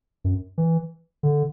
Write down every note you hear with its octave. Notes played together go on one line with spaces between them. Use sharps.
F#2
E3
D3